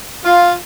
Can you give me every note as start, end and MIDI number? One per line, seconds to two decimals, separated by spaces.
0.24 0.54 65